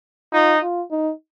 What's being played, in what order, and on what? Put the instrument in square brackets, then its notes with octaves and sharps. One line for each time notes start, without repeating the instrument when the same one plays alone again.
[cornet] D#4 [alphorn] F4
[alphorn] F4
D#4